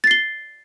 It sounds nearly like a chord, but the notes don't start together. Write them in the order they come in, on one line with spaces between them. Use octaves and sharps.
A6 C7 G7